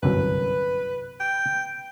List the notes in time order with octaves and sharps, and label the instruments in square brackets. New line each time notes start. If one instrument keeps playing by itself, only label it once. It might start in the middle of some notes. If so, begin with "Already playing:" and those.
[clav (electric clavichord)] G1 C2 F#2 [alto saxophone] B4
[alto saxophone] G5